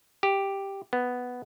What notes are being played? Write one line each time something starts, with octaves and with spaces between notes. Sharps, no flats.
G4
B3